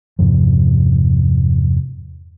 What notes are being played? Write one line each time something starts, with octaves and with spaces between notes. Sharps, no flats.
E2 G2 C3 F3